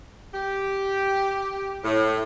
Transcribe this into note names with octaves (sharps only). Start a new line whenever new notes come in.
G4
A2